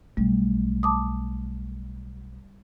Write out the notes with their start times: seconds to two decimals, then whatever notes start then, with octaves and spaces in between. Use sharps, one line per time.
0.17 B1 G3 A3
0.83 A5 D6 D#6